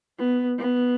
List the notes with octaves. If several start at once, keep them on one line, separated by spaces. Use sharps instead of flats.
B3
B3